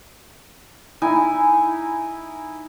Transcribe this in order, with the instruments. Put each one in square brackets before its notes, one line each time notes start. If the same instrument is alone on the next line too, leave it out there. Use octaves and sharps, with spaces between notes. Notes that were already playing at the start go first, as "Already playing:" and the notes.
[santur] D#4 E4 G#5